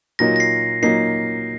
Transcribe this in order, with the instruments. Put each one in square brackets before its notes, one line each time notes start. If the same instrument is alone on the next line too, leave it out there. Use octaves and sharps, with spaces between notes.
[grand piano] A#2 F#3 A#3 D#4 [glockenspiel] A#6
[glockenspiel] A#6
C7
[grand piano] A#2 F#3 A#3 D#4 [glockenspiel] C7